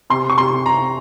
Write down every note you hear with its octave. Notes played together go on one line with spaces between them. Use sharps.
C3 C6
C#6
C3 C6
C3 A#5